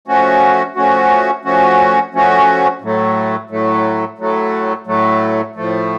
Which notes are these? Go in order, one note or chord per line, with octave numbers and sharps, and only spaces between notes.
F3 A3 C#4 F#4
F3 A3 C#4 F#4
F3 A3 C#4 F#4
F3 A3 C#4 F#4
A2 F#3 A3
A2 F#3 A3
A2 F#3 A3
A2 F#3 A3
A2 F3 A3